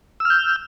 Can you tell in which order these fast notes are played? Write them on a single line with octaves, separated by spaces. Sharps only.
E6 F6 G6